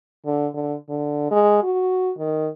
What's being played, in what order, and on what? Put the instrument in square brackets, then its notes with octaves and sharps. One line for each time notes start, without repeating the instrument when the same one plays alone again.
[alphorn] D3
D3
D3
G#3
F#4
D#3